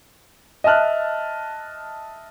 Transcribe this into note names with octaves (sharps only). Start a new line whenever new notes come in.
D#5 E5 A5 F6 F#6